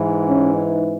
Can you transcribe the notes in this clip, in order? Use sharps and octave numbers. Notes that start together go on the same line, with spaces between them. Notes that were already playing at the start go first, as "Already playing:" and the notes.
Already playing: G#2 E3
C#4
D#4